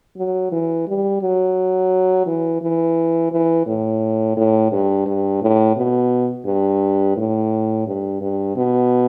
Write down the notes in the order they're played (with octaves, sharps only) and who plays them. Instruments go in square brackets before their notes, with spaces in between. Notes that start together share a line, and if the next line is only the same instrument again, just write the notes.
[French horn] F#3
E3
G3
F#3
E3
E3
E3
A2
A2
G2
G2
A2
B2
G2
A2
G2
G2
B2